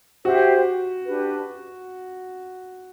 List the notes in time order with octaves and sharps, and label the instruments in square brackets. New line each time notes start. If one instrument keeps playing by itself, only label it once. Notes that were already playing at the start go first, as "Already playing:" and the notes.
[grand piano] F#4 [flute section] G4 C5 E5 G5
[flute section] D4 G4 B4